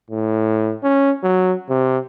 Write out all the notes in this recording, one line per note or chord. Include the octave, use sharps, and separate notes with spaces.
A2
C#4
F#3
C3